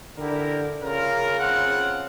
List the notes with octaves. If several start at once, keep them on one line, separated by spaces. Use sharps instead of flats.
D3 E4 G4 A#4
C#3 F4 A#4
C4 F4 F#5